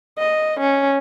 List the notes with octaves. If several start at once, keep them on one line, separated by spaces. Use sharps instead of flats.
D#5
C#4